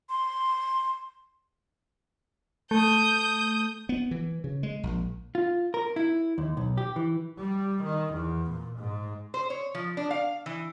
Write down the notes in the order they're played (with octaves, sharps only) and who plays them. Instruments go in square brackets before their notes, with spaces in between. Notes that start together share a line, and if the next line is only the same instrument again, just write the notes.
[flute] C6
[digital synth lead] A3 [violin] D#6 G6
[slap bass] B3
E3
C#3
G#3
A#1
[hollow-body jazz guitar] F4
A#4
E4
D#2
B1
G4
E3
[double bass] G3
D#3
E2
A#2
G#2
[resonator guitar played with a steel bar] C5
C#5
F3
D4
F5
E3